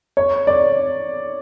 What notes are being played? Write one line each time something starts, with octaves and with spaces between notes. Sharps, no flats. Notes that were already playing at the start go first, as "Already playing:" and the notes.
C#5
D5